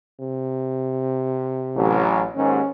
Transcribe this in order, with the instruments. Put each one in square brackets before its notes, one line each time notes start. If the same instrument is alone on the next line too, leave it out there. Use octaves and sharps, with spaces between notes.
[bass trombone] C3
[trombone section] A1 F#3
[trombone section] D#2 G#2 [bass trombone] C#4